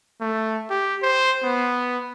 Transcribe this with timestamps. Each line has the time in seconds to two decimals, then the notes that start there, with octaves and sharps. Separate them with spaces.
0.21 A3
0.70 G4
1.02 C5
1.43 B3